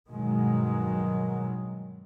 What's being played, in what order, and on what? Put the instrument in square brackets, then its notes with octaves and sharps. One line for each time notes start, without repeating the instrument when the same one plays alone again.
[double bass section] G2 B2 D#3 F#3 G#3